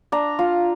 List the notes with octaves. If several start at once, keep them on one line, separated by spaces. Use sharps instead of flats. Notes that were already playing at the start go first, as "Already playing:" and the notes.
D4 A#5
F4